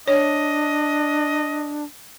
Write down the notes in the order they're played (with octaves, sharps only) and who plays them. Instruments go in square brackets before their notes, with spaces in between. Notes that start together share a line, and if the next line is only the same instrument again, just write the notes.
[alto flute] D4 [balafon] C#5 [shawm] D#5